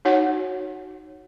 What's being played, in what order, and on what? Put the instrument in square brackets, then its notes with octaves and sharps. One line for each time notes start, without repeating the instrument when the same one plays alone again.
[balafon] D#4 F#4 C#5 F#5